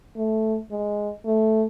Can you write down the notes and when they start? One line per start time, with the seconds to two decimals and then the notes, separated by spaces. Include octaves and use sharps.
0.16 A3
0.71 G#3
1.25 A3